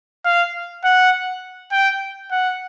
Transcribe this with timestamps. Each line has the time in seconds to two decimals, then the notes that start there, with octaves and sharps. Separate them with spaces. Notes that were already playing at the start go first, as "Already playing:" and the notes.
0.25 F5
0.84 F#5
1.71 G5
2.31 F#5